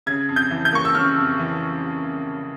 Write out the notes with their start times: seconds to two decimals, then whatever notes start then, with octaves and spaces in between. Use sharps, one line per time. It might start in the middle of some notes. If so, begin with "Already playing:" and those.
0.06 C#3 G#6
0.29 F2
0.36 G6
0.51 E3
0.65 G6
0.73 A#3 C#6
0.85 E6
0.95 C#3 F6
1.16 F2
1.39 E3